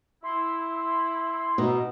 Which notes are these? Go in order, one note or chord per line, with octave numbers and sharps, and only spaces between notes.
E4 C6
B2 D#4